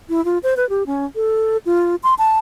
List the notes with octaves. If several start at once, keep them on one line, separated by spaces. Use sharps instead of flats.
E4
F4
C5
B4
G4
C#4
A4
F4
C6
A5